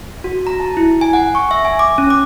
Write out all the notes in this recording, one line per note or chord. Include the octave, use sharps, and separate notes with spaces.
F#4
A#5
A5
E4
G#5
F#5
C#6
E5
G#5
D6
C#4
D6